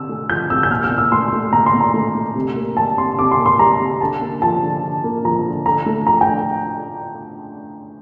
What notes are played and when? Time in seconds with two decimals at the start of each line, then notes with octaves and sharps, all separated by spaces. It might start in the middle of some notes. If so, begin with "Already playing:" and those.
Already playing: C3 E6
0.09 A3
0.29 F3 G6
0.50 C3 E6
0.63 G6
0.70 A#2 F6
0.84 F6
0.91 A#2
0.98 E6
1.12 A3 C6
1.33 A3
1.53 A#2 A#5
1.66 C6
1.74 A#2
1.80 A#5
1.94 A3
2.15 A3
2.36 C3
2.56 A#3
2.77 G3 A5
2.98 C3 C6
3.18 C3 D6
3.31 C6
3.39 A#3
3.46 C6
3.59 G3 A#5
3.80 C3
4.01 D3 A5
4.22 A#3
4.42 F3 A5
4.62 D3
4.83 D3
5.04 A#3
5.25 F3 A#5
5.46 D3
5.66 D3 A#5
5.86 A3
6.07 F3 A#5
6.21 G5
6.27 D3